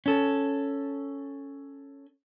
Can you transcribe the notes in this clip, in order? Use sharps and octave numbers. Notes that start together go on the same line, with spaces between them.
C#4 A4